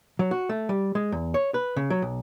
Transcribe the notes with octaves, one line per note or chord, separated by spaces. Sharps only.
F#3
F#4
A3
G3
G#3
E2
C#5
B4
C#3
F#3
B1